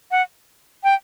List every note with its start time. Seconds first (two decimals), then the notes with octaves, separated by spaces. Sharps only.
0.11 F#5
0.84 G5